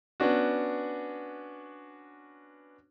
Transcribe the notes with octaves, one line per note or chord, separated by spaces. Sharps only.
B3 C#4 D4 F#4